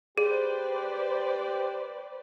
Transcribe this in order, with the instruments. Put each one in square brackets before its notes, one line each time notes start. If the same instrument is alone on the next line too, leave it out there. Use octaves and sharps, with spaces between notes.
[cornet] G4 [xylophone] G#4 [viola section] B4 C5 D5